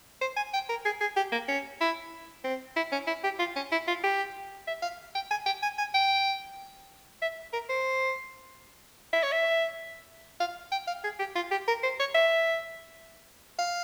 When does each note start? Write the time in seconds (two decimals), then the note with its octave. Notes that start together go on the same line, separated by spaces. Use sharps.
0.21 C5
0.37 G#5
0.54 G5
0.69 A#4
0.85 G#4
1.01 G#4
1.17 G4
1.32 A#3
1.48 C#4
1.81 E4
2.44 C4
2.77 E4
2.92 C#4
3.07 E4
3.24 G4
3.39 F4
3.56 C#4
3.72 E4
3.88 F4
4.04 G4
4.68 E5
4.82 F5
5.15 G5
5.31 G#5
5.46 G5
5.62 G#5
5.78 G#5
5.94 G5
7.22 E5
7.53 A#4
7.69 C5
9.13 E5
9.23 C#5
9.32 E5
10.40 F5
10.72 G5
10.88 F5
11.04 G#4
11.19 G4
11.36 F4
11.51 G4
11.68 A#4
11.83 C5
12.00 C#5
12.15 E5
13.59 F5